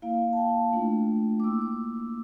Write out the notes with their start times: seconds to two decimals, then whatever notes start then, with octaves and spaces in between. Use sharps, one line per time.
0.02 A#3 E4 F5
0.33 A5
0.37 G5
0.73 A3 D4 F4
1.40 D6
1.44 A#3 E4 E6
1.61 D6